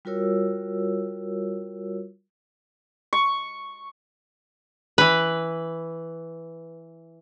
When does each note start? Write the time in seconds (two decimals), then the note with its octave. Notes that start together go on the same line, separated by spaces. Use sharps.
0.05 G3 F4 F#4 A#4 C#5 E6
3.13 C#6
4.98 E3 B4